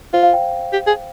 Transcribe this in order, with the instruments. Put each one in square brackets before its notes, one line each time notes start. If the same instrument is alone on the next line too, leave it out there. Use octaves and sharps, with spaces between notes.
[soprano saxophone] F4 [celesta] C5
[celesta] F5
G5
[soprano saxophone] G4
G#4